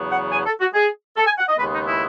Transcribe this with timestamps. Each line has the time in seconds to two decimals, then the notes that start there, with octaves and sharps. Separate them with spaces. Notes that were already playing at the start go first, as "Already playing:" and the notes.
Already playing: E2 C#3 F#3 B3
0.12 F#5
0.32 G#5
0.46 A4
0.61 F#4
0.74 G#4
1.17 A4
1.27 G#5
1.38 F#5
1.49 D#5
1.59 D#2 C#3 G#3 B3 B4
1.73 D#4
1.87 E4